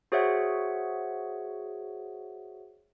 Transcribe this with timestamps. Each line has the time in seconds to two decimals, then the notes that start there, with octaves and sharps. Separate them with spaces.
0.12 F#4 G#4 C5 C#5 E5 F#5